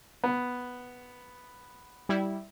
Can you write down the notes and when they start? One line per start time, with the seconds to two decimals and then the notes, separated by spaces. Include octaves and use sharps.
0.24 B3
2.09 G3 E4